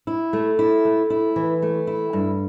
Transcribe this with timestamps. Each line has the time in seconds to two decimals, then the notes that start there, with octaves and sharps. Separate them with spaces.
0.07 E4
0.33 A3
0.59 E4
0.85 A3
1.10 E4
1.36 E3
1.62 A3
1.87 E4
2.13 G2